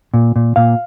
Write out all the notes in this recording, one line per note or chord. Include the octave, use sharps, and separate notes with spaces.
A#2
A#2
A#2 F5